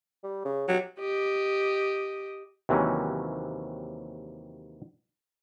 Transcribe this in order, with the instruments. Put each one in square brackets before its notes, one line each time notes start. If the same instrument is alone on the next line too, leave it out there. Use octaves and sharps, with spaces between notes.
[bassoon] G3
C#3
[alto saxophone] F#3 [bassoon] G4
[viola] G4 D#5
[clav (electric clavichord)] D#2 C3 E3 F#3 C4 C#4